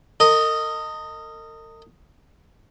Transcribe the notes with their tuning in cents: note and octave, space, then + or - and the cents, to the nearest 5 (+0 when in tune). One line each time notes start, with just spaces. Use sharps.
A#4 -45 D#5 +0